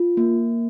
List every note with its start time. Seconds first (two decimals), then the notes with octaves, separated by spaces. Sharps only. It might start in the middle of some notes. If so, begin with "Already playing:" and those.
Already playing: F4
0.17 A#3